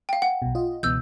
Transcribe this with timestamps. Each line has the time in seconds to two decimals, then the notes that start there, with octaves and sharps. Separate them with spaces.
0.09 F5 G5
0.22 F#5
0.42 B1 B2
0.55 F4 D#5
0.83 C#2 B2 E3 E6 G6